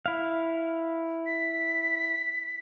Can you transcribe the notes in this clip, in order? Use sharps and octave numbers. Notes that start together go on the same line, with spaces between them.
E4 F5
B6